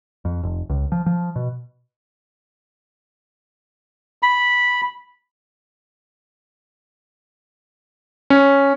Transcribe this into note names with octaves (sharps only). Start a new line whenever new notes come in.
F2
F1
C#2
F3
F3
B2
B5
C#4